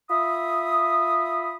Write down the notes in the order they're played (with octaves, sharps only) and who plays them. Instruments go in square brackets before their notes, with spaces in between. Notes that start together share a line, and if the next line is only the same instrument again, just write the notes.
[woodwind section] F4 E5 B5 D#6